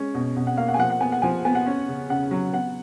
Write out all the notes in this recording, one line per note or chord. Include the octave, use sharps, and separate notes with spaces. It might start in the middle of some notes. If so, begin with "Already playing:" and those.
Already playing: G#3 C#4
B2
B2
F#5
A#3 F5
F#5
G#5
F3 F#5
F#5
B3 G#5
F#5
F3 G#5
B3 G#5
F#5
C#4
C#3
C#3 F#5
F#3
B3 F#5